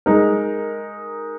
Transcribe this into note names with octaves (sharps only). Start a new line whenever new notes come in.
G#3 D#4 A#4